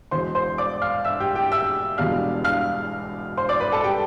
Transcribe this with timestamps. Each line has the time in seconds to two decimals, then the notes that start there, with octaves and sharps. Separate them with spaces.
0.11 E1 E2 B2 C5 C6
0.35 C5 C6
0.58 D5 D6
0.82 F5 F6
1.05 E5 E6
1.20 G4 G5
1.35 G4 G5
1.51 E5 E6
1.98 E1 E2 B2 G3 D4 F5 F6
2.44 F5 F6
3.37 C5 C6
3.49 D5 D6
3.60 B4 B5
3.72 A4 A5
3.84 C3 G3 G4 G5